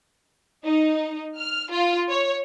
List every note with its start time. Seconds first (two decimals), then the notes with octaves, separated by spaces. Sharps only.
0.65 D#4
1.38 F6
1.71 F4
2.09 C#5